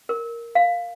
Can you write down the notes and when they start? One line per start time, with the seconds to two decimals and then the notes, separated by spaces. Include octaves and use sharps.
0.09 A#4
0.55 F5